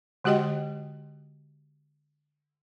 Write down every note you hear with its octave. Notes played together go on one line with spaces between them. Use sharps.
D3 G#3 F#4 G4 D#5 G5